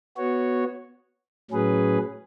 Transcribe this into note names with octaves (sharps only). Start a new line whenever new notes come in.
B3 F#4 C#5
A2 F#3 C#4 G#4 B4